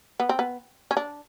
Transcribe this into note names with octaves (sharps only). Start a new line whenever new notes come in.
B3
C4
B3
C#4
D4